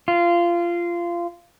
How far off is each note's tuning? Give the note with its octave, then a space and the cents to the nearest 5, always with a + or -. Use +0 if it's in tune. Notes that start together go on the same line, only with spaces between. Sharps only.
F4 -20